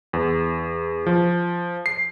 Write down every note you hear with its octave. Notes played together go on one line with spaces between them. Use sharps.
E2
F3
C7